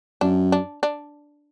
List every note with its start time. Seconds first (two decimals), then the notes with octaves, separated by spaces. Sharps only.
0.21 F#2 D4
0.52 D4
0.83 D4